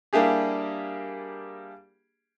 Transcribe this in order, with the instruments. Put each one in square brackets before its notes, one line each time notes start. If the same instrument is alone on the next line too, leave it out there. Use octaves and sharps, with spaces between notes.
[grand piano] G3 A#3 D4 E4 G4 G#4